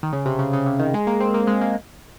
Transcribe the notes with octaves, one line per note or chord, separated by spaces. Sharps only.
D#3
C#3
C3
C#3
C#3
C3
D#3
G#3
A#3
C4
A#3
G#3
A#3